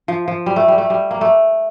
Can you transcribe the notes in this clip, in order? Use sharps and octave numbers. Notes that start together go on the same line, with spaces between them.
F3
F3
G3
A3
G3
A3
G3
A#3
A3